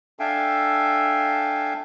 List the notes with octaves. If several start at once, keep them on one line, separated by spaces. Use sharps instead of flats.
D4 A4 E5 F5 G5 G#5